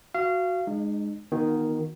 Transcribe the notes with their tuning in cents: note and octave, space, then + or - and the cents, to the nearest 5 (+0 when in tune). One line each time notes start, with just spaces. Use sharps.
F#4 -5 F5 -25
G#3 +0 D#4 -40
D#3 +0 B3 -35 F#4 -40